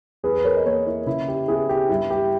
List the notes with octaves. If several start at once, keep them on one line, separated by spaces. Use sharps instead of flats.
E2 G#4 B4
B4
A#4 C#5
D#5
A#3 A#4 C#5
E4
C#3 E4
G4
B3 E4 G#4
G4
G2 E4
G4